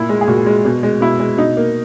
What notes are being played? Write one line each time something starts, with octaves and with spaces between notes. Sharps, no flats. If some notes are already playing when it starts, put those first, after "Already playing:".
Already playing: A#2 E4
G#3
G#4
A#2 F#4
G#3
B2
G#3
B2 E4
G#3
B2 D#4
A#3